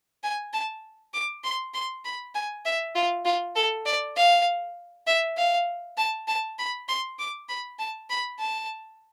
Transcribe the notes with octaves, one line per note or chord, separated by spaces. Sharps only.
G#5
A5
D6
C6
C6
B5
G#5
E5
F4
F4
A4
D5
F5
E5
F5
A5
A5
B5
C6
D6
B5
A5
B5
A5